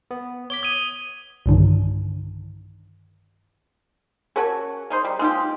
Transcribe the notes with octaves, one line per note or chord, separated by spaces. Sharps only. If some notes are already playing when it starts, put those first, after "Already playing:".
B3
C#5 D6 B6 G7
D#6 G#6 D#7
B1 G2 D3 D#3
C#4 F#4 G#4 A#4 C#5 A5
C#4 D#4 C5
G3
G#3 D#4 F4 G4 B4 C5